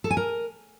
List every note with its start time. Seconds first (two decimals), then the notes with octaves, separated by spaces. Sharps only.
0.04 A4
0.11 G#5
0.17 A#4